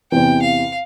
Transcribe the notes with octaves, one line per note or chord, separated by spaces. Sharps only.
E2 C3 E3 G5
F5